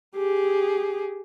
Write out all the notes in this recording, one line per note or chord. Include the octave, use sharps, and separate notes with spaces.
G4 G#4